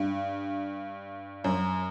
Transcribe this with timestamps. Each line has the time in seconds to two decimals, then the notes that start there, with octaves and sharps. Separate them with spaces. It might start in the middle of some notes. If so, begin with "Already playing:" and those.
Already playing: G2
1.44 F#2